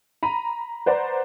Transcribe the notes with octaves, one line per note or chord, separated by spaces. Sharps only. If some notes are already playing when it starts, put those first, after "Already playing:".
A#5 B5 D#7
B4 C5 D5 F#5 A#5